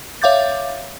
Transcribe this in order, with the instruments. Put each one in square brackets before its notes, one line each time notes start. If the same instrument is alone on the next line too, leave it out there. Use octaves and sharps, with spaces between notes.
[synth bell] C#5 E5 F5 D6 G6 A6